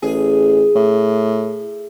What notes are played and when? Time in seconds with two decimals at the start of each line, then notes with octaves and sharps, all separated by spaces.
0.02 A1 G#4
0.75 A2